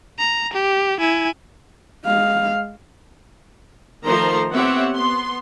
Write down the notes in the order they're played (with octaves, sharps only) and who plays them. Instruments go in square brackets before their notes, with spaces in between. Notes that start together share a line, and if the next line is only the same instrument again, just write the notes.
[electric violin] A#5
G4
E4 G#5
[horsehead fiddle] G#3 F5
[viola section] D#3 F3 A3 C5 A#5 C6
B3 C4 G4 C#5 E5 F#5
B3 C6